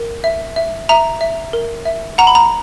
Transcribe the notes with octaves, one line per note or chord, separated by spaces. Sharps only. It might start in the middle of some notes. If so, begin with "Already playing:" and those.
Already playing: A#4
E5
E5
E5 A#5
E5
A#4
E5
F#5 A#5
B5
A#5